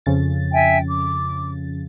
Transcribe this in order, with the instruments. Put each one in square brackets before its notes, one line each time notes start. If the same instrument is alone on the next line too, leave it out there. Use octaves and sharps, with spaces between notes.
[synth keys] F2 C#3 A6
[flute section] E5 G5 G#5
D6